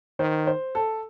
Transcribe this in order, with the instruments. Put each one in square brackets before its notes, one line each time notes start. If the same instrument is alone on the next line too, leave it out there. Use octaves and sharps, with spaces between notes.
[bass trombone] D#3 [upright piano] C5
[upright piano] C5
A4